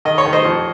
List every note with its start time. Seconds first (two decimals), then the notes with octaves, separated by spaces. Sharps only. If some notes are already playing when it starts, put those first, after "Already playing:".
0.05 D#3 D#5
0.18 C#5
0.26 D#3
0.33 C5 D#5
0.45 F2